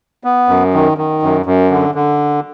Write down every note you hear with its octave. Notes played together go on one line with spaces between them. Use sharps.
B3
F#2
D#3
D#3
F#2
F#2
D3
D3